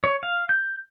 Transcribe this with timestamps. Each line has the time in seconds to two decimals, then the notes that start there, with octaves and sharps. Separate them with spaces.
0.04 C#5
0.23 F5
0.49 G6